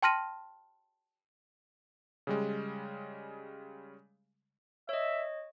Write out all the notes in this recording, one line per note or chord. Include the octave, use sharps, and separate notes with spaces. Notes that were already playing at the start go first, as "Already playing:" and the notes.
G5 A5 C6 F6 A#6 D#7
C#3 G3 G#3
C#5 D#5 E5